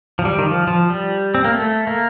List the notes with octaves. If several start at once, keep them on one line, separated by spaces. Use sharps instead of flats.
F3
G3
D#3
F3
F3
G3
C4
A#3
A3
A#3